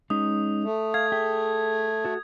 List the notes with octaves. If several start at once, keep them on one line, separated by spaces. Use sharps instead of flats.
G#3 C#4 D#4 D#6
A3
F5 G#6
G#4 E5 G5
F#4 A4